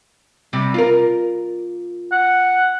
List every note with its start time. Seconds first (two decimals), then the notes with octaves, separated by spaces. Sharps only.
0.53 C3 G3
0.74 F4 A#4
2.12 F#5